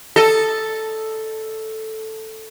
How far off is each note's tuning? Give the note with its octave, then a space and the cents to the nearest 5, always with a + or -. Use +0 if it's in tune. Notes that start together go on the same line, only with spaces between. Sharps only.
A4 +0 D#5 -10